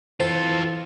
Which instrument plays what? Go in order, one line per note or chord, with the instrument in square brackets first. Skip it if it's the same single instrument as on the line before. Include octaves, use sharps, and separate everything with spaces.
[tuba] E3 [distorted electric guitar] F4 A4 [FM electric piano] C5